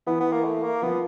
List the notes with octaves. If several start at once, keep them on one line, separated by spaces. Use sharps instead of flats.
E3 B3 E4
B3
A#3
A3
A#3
F3 B3 F4